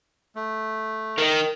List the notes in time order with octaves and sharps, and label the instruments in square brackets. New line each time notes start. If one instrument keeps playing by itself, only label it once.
[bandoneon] A3
[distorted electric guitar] D#3 [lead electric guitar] A#4 D#5